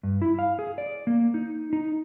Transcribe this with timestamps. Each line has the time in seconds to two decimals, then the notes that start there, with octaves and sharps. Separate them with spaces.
0.03 G2
0.22 E4
0.39 F5
0.59 G#4
0.78 D5
1.07 A#3
1.34 D#4
1.73 D#4